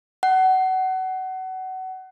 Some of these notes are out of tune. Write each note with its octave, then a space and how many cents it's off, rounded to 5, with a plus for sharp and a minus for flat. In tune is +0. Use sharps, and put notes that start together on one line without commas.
F#5 +25